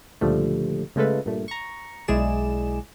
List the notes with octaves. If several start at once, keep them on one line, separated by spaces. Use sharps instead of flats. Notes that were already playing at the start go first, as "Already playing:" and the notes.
C#2 A#2 D3 F3 G3 A3
C#3 G#3 A3 F4 A4 B4
G2 A#2 A3
A#5 C#6
B1 G#3 E4 G#4 D5 E7